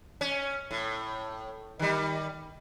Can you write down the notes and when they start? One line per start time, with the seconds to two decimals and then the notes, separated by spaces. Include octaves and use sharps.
0.21 C#4
0.71 A2
1.79 D#3 G3